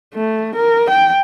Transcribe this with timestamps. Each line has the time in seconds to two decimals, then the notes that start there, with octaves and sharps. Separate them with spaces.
0.14 A3
0.56 A#4
0.90 G5